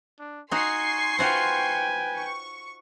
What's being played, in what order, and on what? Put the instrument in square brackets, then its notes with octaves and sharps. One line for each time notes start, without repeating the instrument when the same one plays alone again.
[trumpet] D4
[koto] D#4 F#4 [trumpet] G#5 [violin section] C6 C#6 C7
[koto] F4 F#4 C5 [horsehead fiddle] B4 G5 [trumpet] G#5
[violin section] C#6